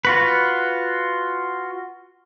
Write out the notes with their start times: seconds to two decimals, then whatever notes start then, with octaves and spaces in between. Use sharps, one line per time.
0.05 F4 F#4 B4